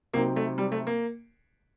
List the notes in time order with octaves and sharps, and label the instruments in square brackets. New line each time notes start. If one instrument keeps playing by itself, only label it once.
[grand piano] C3 F#3 C4 D#4 [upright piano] A#3
[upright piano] A3
G3
A3
A#3